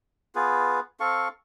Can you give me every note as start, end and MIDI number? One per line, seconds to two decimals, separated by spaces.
0.35 0.80 59
0.35 0.80 65
0.35 0.80 68
0.35 0.80 71
1.00 1.28 60
1.00 1.28 69
1.00 1.28 77
1.00 1.28 85